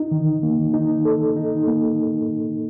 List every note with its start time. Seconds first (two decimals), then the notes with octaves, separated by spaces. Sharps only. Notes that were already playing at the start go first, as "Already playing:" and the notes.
Already playing: D#4
0.11 D#3
0.43 A#3
0.74 D#4
1.05 A4
1.36 D#4
1.67 A#3